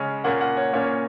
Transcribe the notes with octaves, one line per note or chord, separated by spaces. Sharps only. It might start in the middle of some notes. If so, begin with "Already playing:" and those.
Already playing: C#3 G#3 C#4
A#2 A#3 C#4 F#5
F#5
C#5
A#2 A#3 C#4 C#5